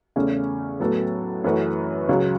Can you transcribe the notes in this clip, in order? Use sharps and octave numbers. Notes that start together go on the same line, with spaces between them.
E2 C#3 A3 C#4
A2 F#3 B3 A4
F#2 E3 A3 F#4 B4
C#2 C#3 F#3